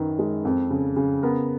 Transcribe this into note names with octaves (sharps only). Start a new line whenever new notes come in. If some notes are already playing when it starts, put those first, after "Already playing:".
Already playing: F#2 D#3 B4
G#3
F2
C#3
C#3
B3 A#4